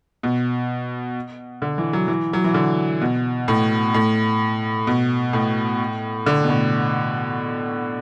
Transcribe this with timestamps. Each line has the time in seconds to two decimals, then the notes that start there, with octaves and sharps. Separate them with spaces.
0.23 B2
1.62 D3
1.78 E3
1.93 F#3
2.08 E3
2.33 F#3
2.44 E3
2.54 D3
3.01 B2
3.48 A2
3.94 A2
4.87 B2
5.33 A2
6.26 D3
6.44 B2
6.49 A2